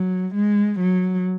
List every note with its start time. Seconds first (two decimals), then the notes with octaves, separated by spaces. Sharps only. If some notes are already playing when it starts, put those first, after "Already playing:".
Already playing: F#3
0.35 G#3
0.80 F#3